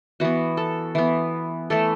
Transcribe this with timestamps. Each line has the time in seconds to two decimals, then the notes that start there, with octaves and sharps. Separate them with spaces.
0.20 E3 B3 F#4
0.57 A4
0.95 E3 B3
1.70 E3 A3 A4